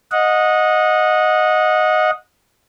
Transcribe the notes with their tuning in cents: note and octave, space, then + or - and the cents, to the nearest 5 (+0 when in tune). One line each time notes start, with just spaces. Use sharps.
D#5 +0 F#5 -25